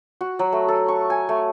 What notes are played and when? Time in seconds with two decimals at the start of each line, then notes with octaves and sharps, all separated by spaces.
0.21 F#4
0.39 F#3
0.52 A3
0.68 A4
0.88 C#6
1.10 G#5
1.29 A3